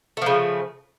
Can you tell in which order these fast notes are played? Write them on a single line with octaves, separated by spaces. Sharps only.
A3 F3 C#3